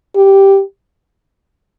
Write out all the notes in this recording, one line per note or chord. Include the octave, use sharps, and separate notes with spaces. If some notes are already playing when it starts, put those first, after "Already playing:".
G4